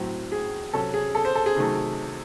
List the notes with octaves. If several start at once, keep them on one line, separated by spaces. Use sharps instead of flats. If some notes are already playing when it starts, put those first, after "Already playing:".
Already playing: A2 F#3 C4
G#4
C3 F#3 C#4 A4
G#4
A4
C5
A4
G#4
C3 D#3 F#3 A3